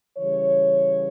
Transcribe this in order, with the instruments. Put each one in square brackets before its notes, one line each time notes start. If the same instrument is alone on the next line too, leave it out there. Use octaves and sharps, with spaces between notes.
[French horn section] C#3 E3 G3 C#5